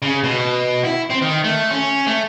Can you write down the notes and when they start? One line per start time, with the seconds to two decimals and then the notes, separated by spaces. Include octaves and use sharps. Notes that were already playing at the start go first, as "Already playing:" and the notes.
0.02 C#3
0.24 B2
0.84 E4
1.10 C4
1.22 D#3
1.44 A3
1.71 C#4
2.07 A3